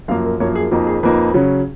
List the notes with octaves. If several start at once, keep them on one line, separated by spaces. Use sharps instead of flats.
F#2 F3 A#3 F5
A#4
F#2 F3 A#3 C#5
G#4
F2 F3 A#3 D#4 F#4
G#4
F2 F3 A#3 D#4 B4
C#3 F#3 C#4